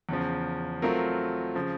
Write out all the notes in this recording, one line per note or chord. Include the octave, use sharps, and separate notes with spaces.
E2 C#3 F3
F#3 A3 C4 F4 A#4
C#3 F3